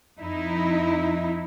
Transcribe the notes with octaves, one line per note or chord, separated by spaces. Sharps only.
F2 D#4 E4